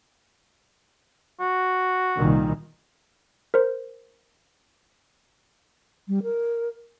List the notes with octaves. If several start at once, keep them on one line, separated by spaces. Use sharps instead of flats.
F#4
C2 A#2 D#3
A#4 C5
G3
A#4